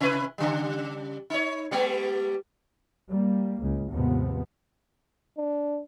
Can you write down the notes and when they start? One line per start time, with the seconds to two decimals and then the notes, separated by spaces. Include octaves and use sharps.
0.01 C3 E4 B4
0.38 C#3 G3
1.30 D#4 C#5
1.71 G3 G#3 B3
3.09 G3 A#3
3.61 C#2
3.91 D#2 G#2 C3 F3 B3
5.38 D4